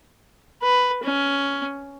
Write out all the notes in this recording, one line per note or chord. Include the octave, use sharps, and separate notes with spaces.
B4
C#4